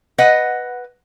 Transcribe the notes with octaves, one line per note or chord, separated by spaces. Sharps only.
B4 D#5 F#5